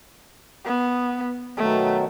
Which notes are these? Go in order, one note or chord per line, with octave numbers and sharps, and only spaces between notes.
B3
B2 D#3 F#3 A3